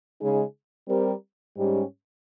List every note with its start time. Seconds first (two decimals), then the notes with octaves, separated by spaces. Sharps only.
0.19 C#3 G#3 D#4 G#4
0.88 G3 C4 G4 A#4
1.57 G#2 G3 C#4 G4